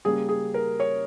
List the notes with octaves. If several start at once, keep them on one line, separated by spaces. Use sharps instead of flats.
C#3 G3 A#3 G#4
G#4
A#4
C#5